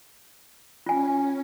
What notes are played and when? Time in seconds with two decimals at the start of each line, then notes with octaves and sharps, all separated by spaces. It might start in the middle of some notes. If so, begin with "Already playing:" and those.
0.86 C#4 F4 G#5